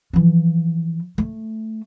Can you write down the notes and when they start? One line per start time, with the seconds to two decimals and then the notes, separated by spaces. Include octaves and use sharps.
0.13 E3 F3
1.18 A3